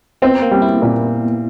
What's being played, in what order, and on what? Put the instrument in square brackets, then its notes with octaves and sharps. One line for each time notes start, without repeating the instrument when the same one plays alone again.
[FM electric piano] B3 [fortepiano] C4
[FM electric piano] A#3
[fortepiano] G3
[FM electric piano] E4
[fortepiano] A#2